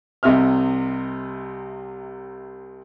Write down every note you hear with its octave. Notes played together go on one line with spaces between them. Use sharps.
C2 C3 D#5 E5 F6